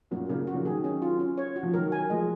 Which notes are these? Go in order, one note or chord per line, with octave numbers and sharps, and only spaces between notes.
F#2 A#2 F#4
A#2 C#3 A#4
F#4
C#3 F3
D#3 F#3 G#4
C#4
F4
C#4
C#5
F#4
F3
D#3 F#3 A#4
G#5
F3 G#3 D#5